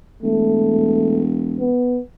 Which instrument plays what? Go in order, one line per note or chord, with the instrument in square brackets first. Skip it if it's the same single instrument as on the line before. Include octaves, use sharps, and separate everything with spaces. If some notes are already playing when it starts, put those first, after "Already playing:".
[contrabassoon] E1 [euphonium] A3
[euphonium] B3